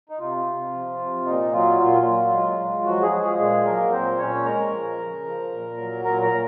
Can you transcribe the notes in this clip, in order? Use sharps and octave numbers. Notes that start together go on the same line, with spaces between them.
D#4
C3 F4
C3
F3
C3
A#2 D#4
F#3 F4
A#2 F4
F#3
G#3
G#3
F3 F#3 F#4
G#3 G#4
F3
G#3 G#4
A#2 G#3 G#4
F#3 A#3 A#4
A#2 C4 C5
A#2 C#4 C#5
G#3 A#4 A#5
F3
C#3
F3
A#2
F#3
A#2 A#4 A#5
A#4 A#5
A#2